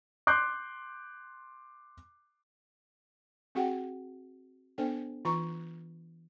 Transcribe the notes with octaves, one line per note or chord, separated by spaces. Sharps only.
C6 D6 F#6 G6 C7
C4 F#4 G#4 F#5 G5
B3 D4 A4 C5 D5 G5
E3 F4 A#5 C#6